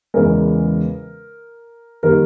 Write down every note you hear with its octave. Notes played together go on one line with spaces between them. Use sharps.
E2 C#3 E3 G#3 A#4
D#3 G3 A#3 A#4